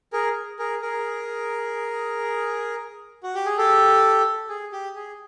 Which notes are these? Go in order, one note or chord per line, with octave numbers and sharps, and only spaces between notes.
G#4 A#4
G#4 A#4
G#4 A#4
F#4
G4
G#4
G4 A4
G#4
G4
G#4